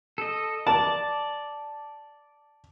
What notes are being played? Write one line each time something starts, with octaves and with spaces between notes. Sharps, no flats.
A4 D#5
D5 A5